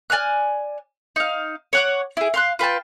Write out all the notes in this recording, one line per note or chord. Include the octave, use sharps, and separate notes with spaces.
D5 G#5 F6 F#6
D#4 F5
C#5 F#5 D6
E4 G#4
F5 C6 F#6
F4 B4 G5 A5